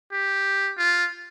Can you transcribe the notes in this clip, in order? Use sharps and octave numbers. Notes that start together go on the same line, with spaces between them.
G4
F4